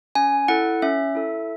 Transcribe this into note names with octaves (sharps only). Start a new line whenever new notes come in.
C#4 G#5
E4 A4 F#5
C#4 E5
E4 A4